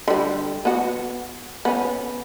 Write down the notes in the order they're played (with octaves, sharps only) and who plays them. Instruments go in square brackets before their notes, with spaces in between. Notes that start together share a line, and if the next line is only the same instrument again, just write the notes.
[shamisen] D3 G3
B3 F#4
B3 C#4